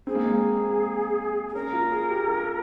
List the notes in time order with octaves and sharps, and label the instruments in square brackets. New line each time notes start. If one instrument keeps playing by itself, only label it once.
[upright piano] C4 [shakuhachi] G#4
[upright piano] A#3
G#3
A#3
[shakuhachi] G#4
[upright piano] C#4 [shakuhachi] A#4
[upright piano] F4
G#4
G4
F4